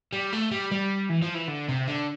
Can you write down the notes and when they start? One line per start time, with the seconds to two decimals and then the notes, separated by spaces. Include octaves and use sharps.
0.13 G3
0.33 A3
0.51 G3
0.71 G3
1.10 E3
1.22 F3
1.35 E3
1.48 D3
1.68 C3
1.88 D3